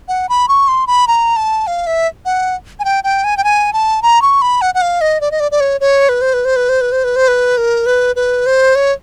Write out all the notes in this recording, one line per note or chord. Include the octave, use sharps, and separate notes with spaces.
F#5
B5
C#6
C6
B5
A#5
A5
F5
E5
F#5
G#5
G5
G5
G#5
G5
G#5
A5
A#5
C#6
B5
F#5
F#5
F5
D#5
D5
D#5
D5
D5
C#5
C#5
B4
C5
B4
C5
B4
C5
B4
C5
B4
C5
B4
A#4
B4
B4
C5
C#5